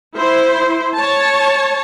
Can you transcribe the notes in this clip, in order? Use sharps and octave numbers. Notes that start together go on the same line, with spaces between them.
E4 C5
C#5 A5